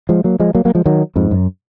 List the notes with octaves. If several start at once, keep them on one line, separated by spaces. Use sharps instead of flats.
F3 G#3
F#3 A#3
F3 G#3
F#3 A#3
F#3 A#3
F3 G#3
D#3 F#3
F2 G#2
F#2